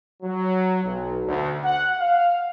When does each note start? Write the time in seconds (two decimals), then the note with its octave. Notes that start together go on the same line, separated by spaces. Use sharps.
0.23 F#3
0.84 B1
1.24 D2
1.64 F#5
1.98 F5